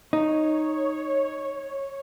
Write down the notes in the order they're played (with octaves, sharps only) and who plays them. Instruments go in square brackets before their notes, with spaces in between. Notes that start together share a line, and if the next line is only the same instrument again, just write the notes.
[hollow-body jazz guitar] D#4 [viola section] C#5